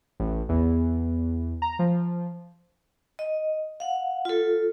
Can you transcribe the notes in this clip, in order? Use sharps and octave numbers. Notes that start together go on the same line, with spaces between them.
A1
E2
A#5
F3
D#5
F5 F#5
F4 A4